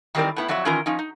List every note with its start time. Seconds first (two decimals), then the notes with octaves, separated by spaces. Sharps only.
0.15 D#3 E3 G3 C4 A#4 D5
0.36 A2 B3 E4
0.48 F2 F#3 F#4 D5 E5
0.65 D#3 E3 C#4 F4 A#4 A#5
0.86 F3 C#4 D#4
0.99 D#4